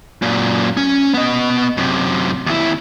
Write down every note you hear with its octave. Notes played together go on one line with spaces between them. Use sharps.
F#2 A#2
C#4
B3 D#5
F#2 C3
D#2 E4